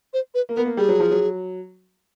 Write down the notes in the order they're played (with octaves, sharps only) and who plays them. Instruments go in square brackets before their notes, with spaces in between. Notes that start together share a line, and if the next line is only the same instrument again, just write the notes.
[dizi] C5
B4
[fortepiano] A#3
[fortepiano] B3 [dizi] A#4
[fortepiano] A#3
[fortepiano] G3 [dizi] G#4
[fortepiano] F#3
F3
F#3